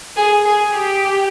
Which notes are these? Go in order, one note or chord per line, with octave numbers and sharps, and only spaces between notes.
G#4
G#4
G4